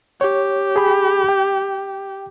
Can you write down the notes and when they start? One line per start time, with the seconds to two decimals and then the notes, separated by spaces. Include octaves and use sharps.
0.21 G4 C#5
0.76 G#4 G5 B5
1.29 G5